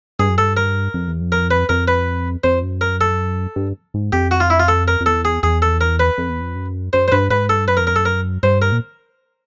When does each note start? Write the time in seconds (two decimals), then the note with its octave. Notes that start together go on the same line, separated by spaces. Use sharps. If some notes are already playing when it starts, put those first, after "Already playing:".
0.19 G2 G#4
0.29 F#2
0.38 G2 A4
0.57 A#4
0.94 F2
1.08 E2
1.21 F2
1.32 A#4
1.51 B4
1.69 F2 A#4
1.88 B4
2.44 F2 C5
2.63 F#2
2.81 A#4
3.01 A4
3.56 G2
3.94 G#2
4.12 F2 G4
4.31 F#4
4.40 F4
4.50 E4
4.60 F4
4.68 A4
4.88 A#4
5.00 F2
5.06 E2 A4
5.25 G#4
5.43 E2 G#4
5.62 A4
5.81 A#4
6.00 B4
6.18 F2
6.29 E2
6.41 F2
6.56 F#2
6.93 F#2 C5
7.08 C5
7.12 G2 B4
7.30 G#2 B4
7.49 G2 A4
7.68 F#2 B4
7.77 A#4
7.80 F2
7.87 A#4
7.94 F#2 A4
8.05 A#4
8.43 G2 C5
8.62 A#4
8.72 A#2